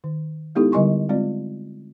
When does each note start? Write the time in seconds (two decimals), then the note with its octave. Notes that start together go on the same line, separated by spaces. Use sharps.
0.04 D#3
0.55 G#3 B3 D#4 E4 G4 A4
0.72 D3 G3 D#5 G#5 C6 C#6
1.09 G#3 C4 F4 D5